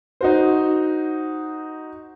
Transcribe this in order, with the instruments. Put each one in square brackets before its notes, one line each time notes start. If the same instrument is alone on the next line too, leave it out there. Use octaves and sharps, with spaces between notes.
[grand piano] D#4 F#4 C5